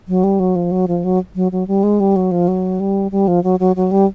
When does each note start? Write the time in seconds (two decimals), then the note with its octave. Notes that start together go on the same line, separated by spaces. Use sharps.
0.08 F#3
0.24 G3
0.40 F#3
0.56 F3
0.71 F#3
0.88 F3
1.04 F#3
1.35 F#3
1.52 F#3
1.68 G3
1.83 G#3
2.00 G3
2.16 F#3
2.31 F3
2.48 F#3
2.80 G3
3.11 G3
3.28 F3
3.44 F#3
3.60 F#3
3.76 F#3
3.91 G3